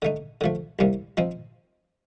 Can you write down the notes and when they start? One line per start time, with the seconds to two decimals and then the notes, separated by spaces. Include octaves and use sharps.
0.02 D3 A3 D#4
0.41 D3 F3 A3
0.79 C2 C3 G3 A#3
1.17 F3 C4 D#4